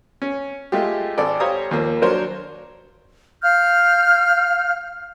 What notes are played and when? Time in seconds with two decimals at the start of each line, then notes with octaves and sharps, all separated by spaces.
0.22 C#4
0.72 G#3 A3 F4 G4
1.18 G#1 A4 D5
1.40 G4 C5 C#5 F5 A#5 D#6
1.71 D#2 F3 A#3
2.02 F#3 D4 A#4 C5 C#5
3.41 F5 F6 G6